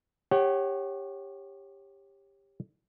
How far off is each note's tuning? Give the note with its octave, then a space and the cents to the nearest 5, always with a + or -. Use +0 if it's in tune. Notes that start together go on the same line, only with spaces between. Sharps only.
G4 +15 C#5 -20 F#5 +35